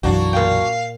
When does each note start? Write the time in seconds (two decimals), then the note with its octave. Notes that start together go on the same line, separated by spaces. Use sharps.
0.03 B1 F#2 E3 A#3 D4 F#4
0.33 A#2 F5 G5